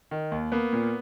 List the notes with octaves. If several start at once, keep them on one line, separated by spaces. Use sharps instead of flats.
D#3
D#2
A#3 B3
A#2